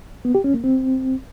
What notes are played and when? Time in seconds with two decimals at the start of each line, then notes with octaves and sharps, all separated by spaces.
0.25 B3
0.35 G4
0.44 C#4
0.54 A#3
0.64 C4